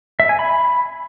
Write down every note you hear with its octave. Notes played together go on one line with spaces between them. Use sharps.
E5
G#5
B5